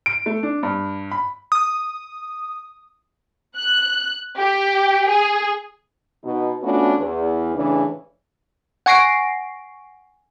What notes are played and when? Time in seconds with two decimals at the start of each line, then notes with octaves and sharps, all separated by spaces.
0.06 D7
0.26 A3
0.43 D4
0.63 G2
1.11 B5
1.52 D#6
3.57 F#6
4.37 G4
5.09 G#4
6.24 B2 D#4
6.63 A3 B3 C#4 D4 F4 F#4
6.99 E2
7.55 A2 C#3 E3 D4
8.86 F#5 G#5 C#6 A#6 C7 D7